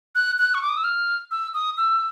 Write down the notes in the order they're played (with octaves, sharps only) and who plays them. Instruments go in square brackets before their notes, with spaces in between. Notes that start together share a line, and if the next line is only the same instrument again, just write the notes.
[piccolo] F#6
F#6
C#6
D6
D#6
E6
F6
E6
D#6
E6